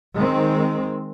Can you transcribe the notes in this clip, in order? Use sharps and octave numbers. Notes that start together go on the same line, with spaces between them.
D#3 G#3 C4